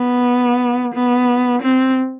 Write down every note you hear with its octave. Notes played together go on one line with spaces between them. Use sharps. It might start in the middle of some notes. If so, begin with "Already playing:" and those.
Already playing: B3
B3
C4